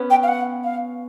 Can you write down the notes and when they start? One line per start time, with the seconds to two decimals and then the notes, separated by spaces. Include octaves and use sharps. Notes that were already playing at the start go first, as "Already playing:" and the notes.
Already playing: B3 C#4
0.10 G5
0.23 F5
0.28 F#5
0.64 F5